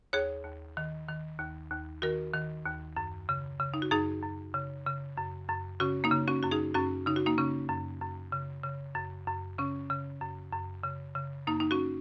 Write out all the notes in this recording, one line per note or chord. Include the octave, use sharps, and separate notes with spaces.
D#2 G#4 C#5
D#2
D#3
D#3
D#2
D#2
D#3 F#4 A#4
D#3
D#2
F#2
C#3
C#3
D#4
F#4
F#2 D#4 G#4
F#2
C#3
C#3
F#2
F#2
C#3 C#4 F#4
A#3 D#4
C#3
C#4 F#4
F#2 F#4
D#4 G#4
F#2 C#4 F#4
C#3 D#4
F#4
A#3 D#4
C#3 C#4
F#2
F#2
C#3
C#3
F#2
F#2
C#3 C#4
C#3
F#2
F#2
C#3
C#3
F#2 A#3 D#4
D#4
C#4 F#4